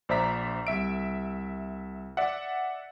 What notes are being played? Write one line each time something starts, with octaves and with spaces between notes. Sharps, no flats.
A#1 C5 D5 E5 A#5 B6
C2 E5 D7
D5 E5 F#5